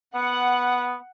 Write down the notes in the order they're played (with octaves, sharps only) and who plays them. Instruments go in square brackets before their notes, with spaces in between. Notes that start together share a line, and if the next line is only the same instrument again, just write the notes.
[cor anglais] B3 [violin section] F#5